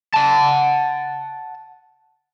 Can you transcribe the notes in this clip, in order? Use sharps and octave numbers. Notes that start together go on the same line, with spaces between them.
F#5 A5